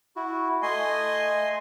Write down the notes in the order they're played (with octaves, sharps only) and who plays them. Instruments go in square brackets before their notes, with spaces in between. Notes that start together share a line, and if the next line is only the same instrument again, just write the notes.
[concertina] E4 F#4
[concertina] A3 [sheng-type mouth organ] D#5 G#5 C6